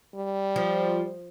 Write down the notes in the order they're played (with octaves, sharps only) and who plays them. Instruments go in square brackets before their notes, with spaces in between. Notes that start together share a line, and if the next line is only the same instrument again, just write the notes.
[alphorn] G3
[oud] F3